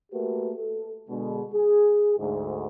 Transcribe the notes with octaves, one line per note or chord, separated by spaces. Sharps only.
A3 A#3 F#4 G4 A#4 B4
A4
B2 D3 G#3
G#4
D2 G#2